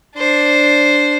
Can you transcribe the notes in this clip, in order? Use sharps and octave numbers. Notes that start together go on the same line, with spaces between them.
D4 C5